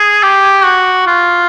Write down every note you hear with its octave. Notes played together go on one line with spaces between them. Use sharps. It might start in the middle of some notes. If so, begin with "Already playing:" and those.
Already playing: G#4
G4
F#4
F4